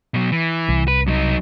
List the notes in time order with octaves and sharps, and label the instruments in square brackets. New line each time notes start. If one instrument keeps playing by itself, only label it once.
[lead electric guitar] B2 F#3
E3
[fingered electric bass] C2
[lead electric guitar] B4
F#3 D#4